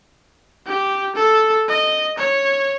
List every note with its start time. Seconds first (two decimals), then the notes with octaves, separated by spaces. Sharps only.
0.67 G4
1.15 A4
1.68 D#5
2.18 C#5